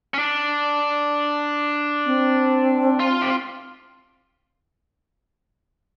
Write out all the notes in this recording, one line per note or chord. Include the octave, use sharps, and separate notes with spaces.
C#4
D4
C4
F4
G4